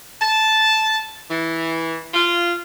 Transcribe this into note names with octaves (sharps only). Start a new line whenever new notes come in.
A5
E3
F4